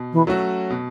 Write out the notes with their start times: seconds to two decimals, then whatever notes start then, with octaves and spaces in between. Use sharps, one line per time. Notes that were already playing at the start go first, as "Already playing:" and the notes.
Already playing: B2
0.13 E3
0.27 F#3 A3 C#4 F#4
0.70 B2